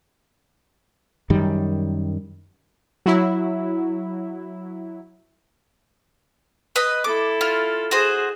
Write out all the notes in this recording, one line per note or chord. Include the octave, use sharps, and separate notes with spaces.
F#2 D#3 G3
F#3 E4
B4 D#5
E4 A4 D6
F4
F#4 G#4 C5